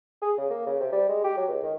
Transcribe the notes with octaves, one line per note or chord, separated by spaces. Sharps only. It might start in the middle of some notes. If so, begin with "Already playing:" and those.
G#4
C#3
A#3
C#3
C3
G3
G#3
G4
F#3
C#2
D#3